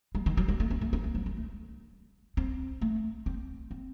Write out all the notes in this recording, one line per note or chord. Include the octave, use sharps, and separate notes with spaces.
G#3
D#3
F#3
G#3
A3
C4
A3
C4
A3
F#3
G#3
A3
C4
A3
C4
C4